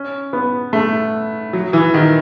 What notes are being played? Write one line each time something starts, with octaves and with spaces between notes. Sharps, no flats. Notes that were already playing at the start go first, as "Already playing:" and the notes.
Already playing: C#4
B3
A3
F#3
E3
D#3